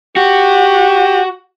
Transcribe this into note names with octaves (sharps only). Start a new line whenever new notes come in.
F#4 G4